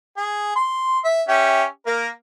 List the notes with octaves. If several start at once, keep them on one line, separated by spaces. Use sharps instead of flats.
G#4
C6
E5
C#4 G4 E5
A#3 A#4